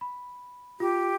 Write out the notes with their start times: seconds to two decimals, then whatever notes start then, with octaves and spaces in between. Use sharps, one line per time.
0.01 B5
0.80 F4 G4